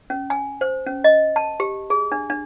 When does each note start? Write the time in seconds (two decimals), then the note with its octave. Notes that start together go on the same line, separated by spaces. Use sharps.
0.10 C#4
0.30 G#5
0.61 C5
0.87 C#4
1.04 D#5
1.36 A5
1.60 G4
1.90 G#4
2.12 D4
2.30 D4